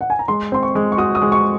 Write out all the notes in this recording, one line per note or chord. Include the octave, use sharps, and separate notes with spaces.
F#5
G#5
A#5
G#3 C6
C4 C6
C#6
G#3
C#6
F#4 D#6
D#6
G#3
C#6